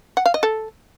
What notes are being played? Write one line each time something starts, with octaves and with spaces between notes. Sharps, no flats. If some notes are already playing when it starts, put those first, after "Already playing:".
F#5
F5
D#5
A4